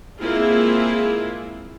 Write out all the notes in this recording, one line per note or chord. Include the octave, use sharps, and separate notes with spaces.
G#3 A#3 C4 E4 F4 G#4